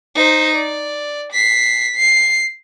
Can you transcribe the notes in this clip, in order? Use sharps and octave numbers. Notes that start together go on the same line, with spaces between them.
D#4 C5
D5
B6 C7
C7